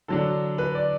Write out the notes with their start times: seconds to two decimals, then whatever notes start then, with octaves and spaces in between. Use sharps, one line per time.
0.08 D3 F#3 D4 A4
0.58 B4
0.75 D5